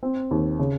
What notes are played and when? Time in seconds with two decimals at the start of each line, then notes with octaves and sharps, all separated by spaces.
0.03 C4
0.31 D#2
0.59 C#3